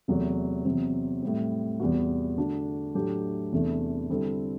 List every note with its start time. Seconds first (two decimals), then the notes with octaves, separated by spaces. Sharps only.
0.08 E2 C3 F#3 A3
0.65 E2 C3 F#3 C4
1.22 A2 G3 C4
1.80 E2 C3 G3 B3 F#4
2.37 D3 A3 D4 F#4
2.95 A2 F#3 A3 D4 G4
3.52 E2 C3 E3 A3 D4
4.10 D3 G3 C4 E4 A4